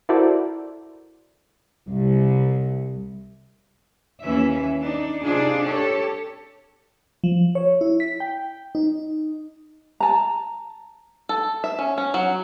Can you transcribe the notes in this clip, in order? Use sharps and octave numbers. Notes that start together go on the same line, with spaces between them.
E4 F#4 A4 A#4 C5 D5
C2
D#2 E3 C#4 E5
D4 D#4
C3 D4 D#4 F4 G#4
G4 A4 C#5
F3
C#5
E4
B6
G5
D#4
A5 A#5
A4
E5
C#4
C#4
F#3